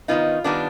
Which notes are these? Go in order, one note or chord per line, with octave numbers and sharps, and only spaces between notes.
D#3 F#3 B3 D#4 F4
D#3 G3 B3 D4